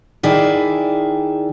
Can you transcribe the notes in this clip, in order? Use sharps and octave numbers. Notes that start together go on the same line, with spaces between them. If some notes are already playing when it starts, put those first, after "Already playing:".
D#3 E4 G#4 D5